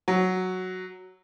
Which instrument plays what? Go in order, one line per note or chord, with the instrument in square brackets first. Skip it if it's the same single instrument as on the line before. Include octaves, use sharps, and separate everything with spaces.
[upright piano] F#3